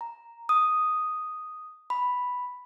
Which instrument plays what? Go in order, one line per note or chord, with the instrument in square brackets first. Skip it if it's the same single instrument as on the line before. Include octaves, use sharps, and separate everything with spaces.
[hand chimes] A#5
D#6
B5